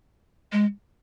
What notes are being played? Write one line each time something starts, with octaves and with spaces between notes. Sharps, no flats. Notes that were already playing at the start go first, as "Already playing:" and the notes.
G#3